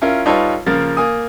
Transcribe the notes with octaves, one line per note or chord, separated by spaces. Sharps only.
C#4 E4 F4 A#4
G3 D#4 F4 A4 B4 C#5
C#3 F3 A#3 A#4 A6
A#3 G#5 D#6